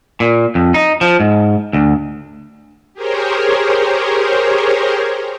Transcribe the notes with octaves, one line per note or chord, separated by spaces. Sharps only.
A#2
F2
D#4
F3
G#2
D2
G4 G#4 A#4 C5 C#5